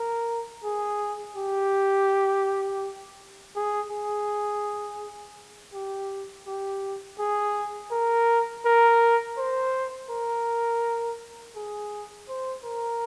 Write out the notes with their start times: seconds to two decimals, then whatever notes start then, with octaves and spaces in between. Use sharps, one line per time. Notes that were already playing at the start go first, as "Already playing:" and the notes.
Already playing: A#4
0.64 G#4
1.36 G4
3.56 G#4
3.91 G#4
5.74 G4
6.47 G4
7.19 G#4
7.91 A#4
8.65 A#4
9.38 C5
10.10 A#4
11.56 G#4
12.29 C5
12.64 A#4